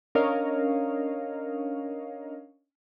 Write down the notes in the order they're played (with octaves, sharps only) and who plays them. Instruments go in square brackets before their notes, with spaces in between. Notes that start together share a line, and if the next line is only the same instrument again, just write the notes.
[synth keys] C#4 D4 A#4 C#5 D#5 F5